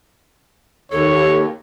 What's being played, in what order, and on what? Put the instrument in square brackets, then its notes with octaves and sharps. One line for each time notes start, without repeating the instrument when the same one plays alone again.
[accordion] D#2 [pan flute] A4 [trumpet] C#5